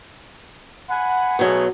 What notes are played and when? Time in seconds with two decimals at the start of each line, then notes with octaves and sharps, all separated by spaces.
0.90 F#5 G#5 B5
1.39 G#2 B2 F#3 A3 G#4